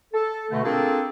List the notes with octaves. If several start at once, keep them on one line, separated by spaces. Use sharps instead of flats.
A4
B2 D3 A3
A#3 C4 D4 F4 G#4 A4